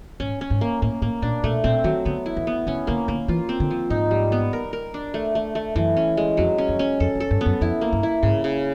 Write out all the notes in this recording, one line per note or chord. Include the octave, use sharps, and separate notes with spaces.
G#2 C#4
C#4
G#2
A#3
A2 A#3
A2 A#3
A#2 D4
B2 A3
A#2 C4
D#3 F#3
D3 B3
E4
E3
B3
D3 C#4
D3 A#3
D3 A#3
E3 F4
C4
D3
F3
G#2 D#4
G3
B3
A#4
A#4
D4
A3
A3
A3
F#2 E3
C#4
G#3
F2 F#3
C#4
F2
C#4
F2 A4
F#2
A4
G2
F#2 B3
F2 E4
A#3
G2
E4
G#2 C#3
C#3